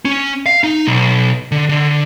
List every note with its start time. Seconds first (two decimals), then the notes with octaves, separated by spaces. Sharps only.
0.05 C#4
0.46 F5
0.64 D#4
0.87 B1
1.52 D3
1.69 D3